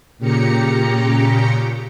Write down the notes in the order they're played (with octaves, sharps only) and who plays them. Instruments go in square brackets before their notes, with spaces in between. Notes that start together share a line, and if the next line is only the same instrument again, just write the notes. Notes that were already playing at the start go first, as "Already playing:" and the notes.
[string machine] A#2 C#3 G4 A#5 C#7